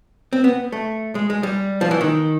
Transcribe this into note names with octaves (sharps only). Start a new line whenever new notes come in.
C4
B3
A3
G#3
G#3
G3
F3
E3
D#3